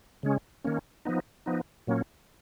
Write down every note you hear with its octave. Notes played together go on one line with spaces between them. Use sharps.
C#3 G#3 C#4
D#3 A#3 C#4
F3 B3 D#4
F3 B3 D#4
A#2 F#3 A#3 C#4